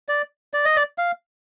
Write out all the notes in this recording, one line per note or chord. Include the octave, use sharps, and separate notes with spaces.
D5
D5
D#5
D5
F5